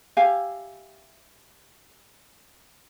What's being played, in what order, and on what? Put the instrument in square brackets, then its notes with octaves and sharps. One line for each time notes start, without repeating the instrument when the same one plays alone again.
[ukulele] G4 E5 F5 G#5